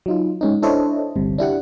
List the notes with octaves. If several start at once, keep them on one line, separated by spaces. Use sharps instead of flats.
F#3 D#4 F4
G#2 C#4 D#4
D4 E4 A4 C5 C#5 D#5
G1 C2 C3
D4 E4 G4 F#5